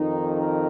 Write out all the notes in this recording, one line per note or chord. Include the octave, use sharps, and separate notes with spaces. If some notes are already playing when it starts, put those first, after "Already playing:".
Already playing: F2 D#3 D#4
A#4